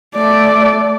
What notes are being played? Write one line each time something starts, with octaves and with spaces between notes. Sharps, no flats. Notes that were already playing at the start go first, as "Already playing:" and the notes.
A3 D5